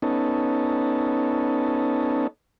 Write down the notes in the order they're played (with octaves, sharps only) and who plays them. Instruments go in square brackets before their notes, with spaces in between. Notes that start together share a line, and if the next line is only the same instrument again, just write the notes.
[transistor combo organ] B3 C#4 D#4 A4